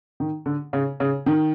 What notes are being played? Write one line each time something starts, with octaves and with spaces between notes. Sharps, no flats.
D#3
D3
C#3
C#3
D#3